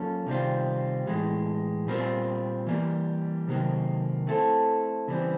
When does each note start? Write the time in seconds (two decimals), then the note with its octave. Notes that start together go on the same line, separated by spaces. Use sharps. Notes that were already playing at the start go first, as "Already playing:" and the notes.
Already playing: F#3 A#3 C#4 F4 A4
0.26 C3 D#3 G3 C4 F4
1.07 A2 E3 G#3
1.87 A#2 G3 C4 F4 A#4
2.67 E3 G3 A#3
3.47 C3 D#3 F#3 A#3
4.27 A3 C4 E4 A4
5.08 C#3 E3 G3 C4